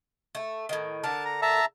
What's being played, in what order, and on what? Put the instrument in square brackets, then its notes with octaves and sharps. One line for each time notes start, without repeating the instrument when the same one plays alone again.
[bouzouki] A3
A2 D#3
[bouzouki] D3 A4 A#4 [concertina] A5
[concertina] A#5
E5 A5 A#5